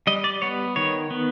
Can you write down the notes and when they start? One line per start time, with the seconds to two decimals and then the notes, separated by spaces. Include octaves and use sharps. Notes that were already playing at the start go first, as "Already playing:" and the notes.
0.07 G3 D#5
0.24 D5
0.42 B3 C#5
0.76 D#3 C#5
1.10 B3